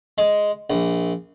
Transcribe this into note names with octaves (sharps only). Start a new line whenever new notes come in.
G#3
A#1